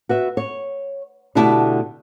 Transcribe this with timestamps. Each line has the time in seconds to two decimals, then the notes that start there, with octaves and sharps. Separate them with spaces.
0.09 F#4 B4 E5
0.37 C#5
1.35 B2 D3 A3 E4 G4 A5